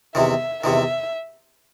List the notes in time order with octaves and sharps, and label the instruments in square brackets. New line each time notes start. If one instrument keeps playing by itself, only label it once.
[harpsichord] E2 C3 D#3 [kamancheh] E5
[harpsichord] E2 C3 D#3 [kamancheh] E5